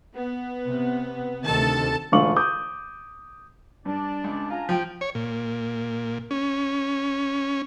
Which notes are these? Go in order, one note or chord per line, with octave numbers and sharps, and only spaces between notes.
B3
C3
D2 C3 D#3 A4 A5
E1 D3 A3 F4 C#6 F#7
D6 D#6 G6
G2 D4 D5
C#2
D4 F4 G#5 A#5
F3 G5
C#5
A#2
C#4